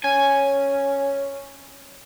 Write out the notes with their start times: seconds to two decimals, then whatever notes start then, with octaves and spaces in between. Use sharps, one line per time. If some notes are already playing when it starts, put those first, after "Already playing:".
0.04 C#4 G#5